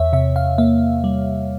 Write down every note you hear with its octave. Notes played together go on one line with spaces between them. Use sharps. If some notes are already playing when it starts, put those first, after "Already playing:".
Already playing: E2 C#5 E5
C3 E5
F5
A#3 E5
G3